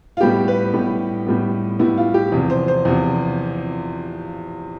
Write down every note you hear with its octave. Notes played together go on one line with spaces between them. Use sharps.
F4
A2 G3 B3 G4
B4
A2 G3 B3
A2 G3 B3
A2 G3 B3 E4
F4
G4
E2 C3 F3
C5
C5
E2 C3 F3